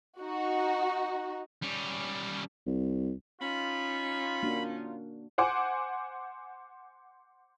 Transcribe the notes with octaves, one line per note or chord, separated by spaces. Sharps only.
D#4 F#4
G3 C#4
C2
C#4 D#4 F4 B5
A#3 D4 F#4
C5 F#5 G#5 D6